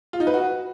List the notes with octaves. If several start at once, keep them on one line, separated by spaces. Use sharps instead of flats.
F4
D#4
B4
F#4